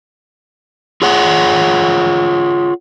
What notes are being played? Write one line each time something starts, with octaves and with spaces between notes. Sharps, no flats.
F4 G#4 C#5 F#5